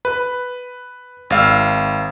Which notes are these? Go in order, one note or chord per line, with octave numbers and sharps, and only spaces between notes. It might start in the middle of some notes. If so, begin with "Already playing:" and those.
B4
G#1 F5 E6